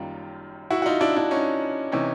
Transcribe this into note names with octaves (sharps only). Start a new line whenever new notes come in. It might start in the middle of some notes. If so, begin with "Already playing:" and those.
Already playing: F#1 F#2 D#3 G3 F4
E4 F#4
F#4
D#4 F4
D4 E4
D4 E4
C#4 D#4
C3 E3 C#4 D#4